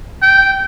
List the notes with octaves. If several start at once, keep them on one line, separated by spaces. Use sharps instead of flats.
G5